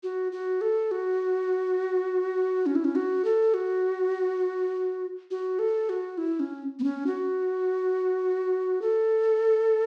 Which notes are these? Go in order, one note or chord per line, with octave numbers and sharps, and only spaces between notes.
F#4
F#4
A4
F#4
C#4
E4
C#4
F#4
A4
F#4
F#4
A4
F#4
E4
C#4
B3
C#4
F#4
A4